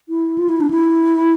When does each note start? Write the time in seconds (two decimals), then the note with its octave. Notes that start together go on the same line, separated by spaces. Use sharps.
0.09 E4
0.38 F4
0.49 E4
0.61 D4
0.70 E4